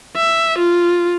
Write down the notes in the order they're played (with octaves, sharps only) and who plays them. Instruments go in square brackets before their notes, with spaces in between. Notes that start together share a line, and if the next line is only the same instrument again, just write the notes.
[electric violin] E5
F4